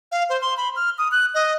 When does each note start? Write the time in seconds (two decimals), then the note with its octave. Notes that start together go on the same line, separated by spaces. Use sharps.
0.12 F5
0.30 C5
0.41 C6
0.57 B5
0.76 F6
0.98 D#6
1.12 F#6
1.34 D#5